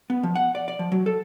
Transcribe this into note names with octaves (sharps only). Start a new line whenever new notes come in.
B3
F3
F#5
D5
D5
F3
F#3
A4